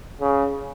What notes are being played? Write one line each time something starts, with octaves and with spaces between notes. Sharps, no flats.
C#3